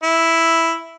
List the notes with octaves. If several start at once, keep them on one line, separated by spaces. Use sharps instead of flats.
E4